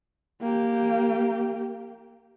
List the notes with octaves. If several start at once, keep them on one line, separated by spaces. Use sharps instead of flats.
A#3 G4